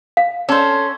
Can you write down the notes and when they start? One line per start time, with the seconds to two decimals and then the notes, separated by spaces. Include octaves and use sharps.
0.17 F5
0.49 C#4 A4 C5